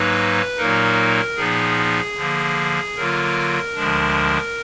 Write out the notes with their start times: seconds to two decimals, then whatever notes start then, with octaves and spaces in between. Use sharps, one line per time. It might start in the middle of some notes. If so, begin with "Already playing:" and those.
Already playing: G#2 F#3 A#3 D#4 B4
0.57 A#2 F#3 A#3 D#4 A#4
1.36 A#2 F3 B3 D#4 G#4
2.16 D3 F3 A#3
2.96 D3 F#3 A#3 F4 A#4
3.75 D2 D3 F3 G#3 D4